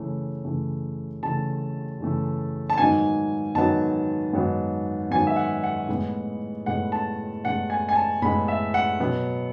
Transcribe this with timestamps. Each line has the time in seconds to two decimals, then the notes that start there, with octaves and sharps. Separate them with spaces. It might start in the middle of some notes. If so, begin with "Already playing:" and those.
Already playing: C#3 E3 A3
0.45 C#3 E3 A3
1.23 C#3 E3 A3 A5
2.00 C#3 E3 A3
2.70 A5
2.78 G#2 D#3 F#3 B3 G#5
3.55 G#2 D#3 F#3 B3 A5
4.33 G#2 D#3 F#3 B3
5.11 G#2 D#3 F#3 B3 G#5
5.27 E5
5.36 F#5
5.63 F#5
5.89 A2 G#3 B3
6.66 A2 G#3 B3 F#5
6.92 A5
7.44 A2 G#3 B3 F#5
7.70 G#5
7.89 G#5
7.96 A5
8.22 A2 G#3 B3 B5
8.48 E5
8.74 F#5
8.99 B2 F#3 B3